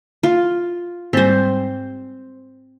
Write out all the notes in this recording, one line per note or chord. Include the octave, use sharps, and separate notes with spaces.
F4
G#2 G3 C4 C5